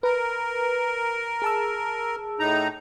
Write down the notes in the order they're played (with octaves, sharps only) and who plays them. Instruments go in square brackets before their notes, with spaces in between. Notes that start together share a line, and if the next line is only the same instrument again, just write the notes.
[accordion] A#4 [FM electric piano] B4
[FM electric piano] G#4 A5 E6
[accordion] A2 D#4 A#5